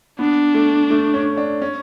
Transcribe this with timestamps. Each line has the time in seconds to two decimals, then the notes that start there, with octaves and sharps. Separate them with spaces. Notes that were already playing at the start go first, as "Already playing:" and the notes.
0.19 B3 D4
0.54 A3
0.90 A3
1.14 C#4
1.37 D4
1.62 C#4